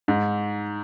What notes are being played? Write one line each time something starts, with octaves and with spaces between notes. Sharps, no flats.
G#2